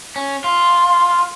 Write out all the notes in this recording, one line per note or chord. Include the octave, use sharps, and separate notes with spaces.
C#4
F4